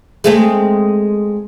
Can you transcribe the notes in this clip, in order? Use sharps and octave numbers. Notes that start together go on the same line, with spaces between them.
G#3 A3 C4